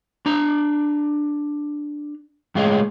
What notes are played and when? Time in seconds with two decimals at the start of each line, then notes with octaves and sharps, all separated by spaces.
0.26 D4 A#5
2.55 A2 G#3 F4 G#4 C#5 D#5